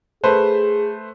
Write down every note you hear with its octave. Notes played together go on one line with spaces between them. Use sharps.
A3 G#4 B4 C5